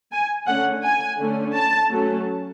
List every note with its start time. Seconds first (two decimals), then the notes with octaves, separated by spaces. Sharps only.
0.12 G#5
0.47 D3 A3 C#4 F#5
0.83 G#5
1.19 D3 A3 C#4
1.55 A5
1.90 F#3 A3 C#4